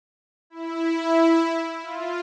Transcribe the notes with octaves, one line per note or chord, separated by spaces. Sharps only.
E4
F4